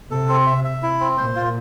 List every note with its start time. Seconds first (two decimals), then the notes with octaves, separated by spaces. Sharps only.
0.11 C3 A4
0.29 C4
0.47 E5
0.64 E5
0.83 E4
1.00 C4
1.18 A#2 C5
1.35 F4